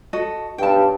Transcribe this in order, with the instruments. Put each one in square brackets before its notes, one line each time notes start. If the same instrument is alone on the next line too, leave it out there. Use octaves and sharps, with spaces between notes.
[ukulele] F#4 A4 D#5
[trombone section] B1 G2 [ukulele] G5 A5